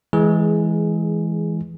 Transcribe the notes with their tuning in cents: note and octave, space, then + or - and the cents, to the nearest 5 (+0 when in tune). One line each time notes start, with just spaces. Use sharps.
E3 +0 G#3 +15 G#4 +0